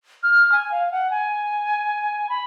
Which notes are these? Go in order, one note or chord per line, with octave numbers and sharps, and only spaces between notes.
F6
G#5
F5
F#5
G#5
B5